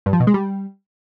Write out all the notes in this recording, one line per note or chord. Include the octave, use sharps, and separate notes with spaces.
G2
F3
B2
G#3
G3